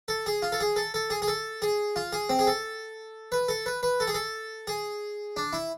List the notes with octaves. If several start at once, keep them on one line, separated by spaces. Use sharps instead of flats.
A4
G#4
F4
A4
G#4
A4
A4
G#4
G#4
A4
G#4
F4
G#4
C4
G#4
A4
B4
A4
B4
B4
A4
G#4
A4
G#4
D4
E4